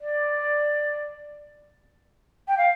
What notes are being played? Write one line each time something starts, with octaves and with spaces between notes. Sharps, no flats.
D5
G5
F5